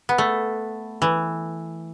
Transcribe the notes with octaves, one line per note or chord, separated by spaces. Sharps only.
B3
A3
E3